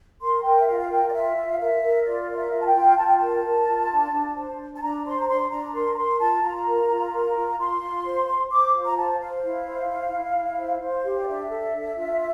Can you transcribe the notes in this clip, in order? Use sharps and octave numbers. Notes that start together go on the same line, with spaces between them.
A#4 C6
A#4 G5
E5
F4 F5
F5
A#4 G5
D5
F4 E5
F4
F5
A#4 E5
A#4
F4 D5
A#4 D5
E5
F4
A5
G5
F4
F4 A5
G5
A#4 A5
A#4
F4
D4
D4
C5
D4
A5
D4 A#5
C5 C6
A#5
D4 C6
D4 A#5
A#4 C6
A#5
A#4 C6
F4 A5
F4 A#5
A#4
F4
A#4
F4
A#5
F4 C6
F4
C5
C5
C5 D6
F4
A#5
C5 A5
C5 F5
E4
C5
E4
E4
E4
C5
C5
G4
D5
D4 E5
A4
D4
F4